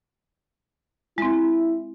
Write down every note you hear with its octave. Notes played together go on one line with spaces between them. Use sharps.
G#3 C4 E4